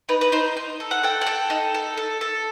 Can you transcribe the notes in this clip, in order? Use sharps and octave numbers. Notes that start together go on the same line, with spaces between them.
D#4 B4
B4
D#4 C5
D#4
A4
F#5
A4 G5
F#5
A4 G5
D#4
A4
A4
A4